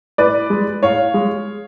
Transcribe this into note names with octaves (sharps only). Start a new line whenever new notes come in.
A2 B4 D5
G#3
A2 C#5 F5
G#3